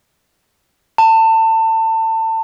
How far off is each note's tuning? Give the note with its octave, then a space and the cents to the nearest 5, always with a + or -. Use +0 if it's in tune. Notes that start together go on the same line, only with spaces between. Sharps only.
A5 +25